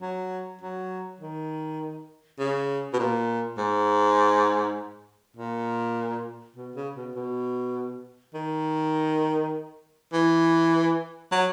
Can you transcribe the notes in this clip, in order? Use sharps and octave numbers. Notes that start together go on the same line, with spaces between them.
F#3
F#3
D#3
C#3
B2
A#2
G#2
A#2
B2
C#3
B2
B2
D#3
E3
F#3